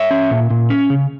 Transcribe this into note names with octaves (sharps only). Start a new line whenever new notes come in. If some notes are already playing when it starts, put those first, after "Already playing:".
Already playing: C#5 E5
C#4
A#2
A#2
C#4
C#3